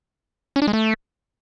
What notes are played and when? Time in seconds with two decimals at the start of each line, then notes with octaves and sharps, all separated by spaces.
0.56 C#4
0.62 D4
0.67 G#3
0.73 A3